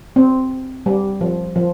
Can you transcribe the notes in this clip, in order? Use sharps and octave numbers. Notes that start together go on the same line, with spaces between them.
C4
G3
F3
F3